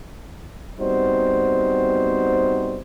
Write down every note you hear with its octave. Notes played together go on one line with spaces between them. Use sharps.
G3 B3 C4 D#4 F#4 C5